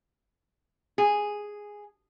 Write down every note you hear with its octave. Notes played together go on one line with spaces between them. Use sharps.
G#4